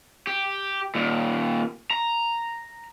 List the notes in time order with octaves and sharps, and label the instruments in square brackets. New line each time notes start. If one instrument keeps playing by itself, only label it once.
[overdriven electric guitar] G4
D#2 A#2
A#5